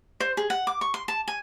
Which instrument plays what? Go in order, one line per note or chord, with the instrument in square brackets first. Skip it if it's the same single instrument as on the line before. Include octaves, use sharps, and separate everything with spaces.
[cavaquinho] C5
G#4
F#5
D6
C#6
C6
A5
G#5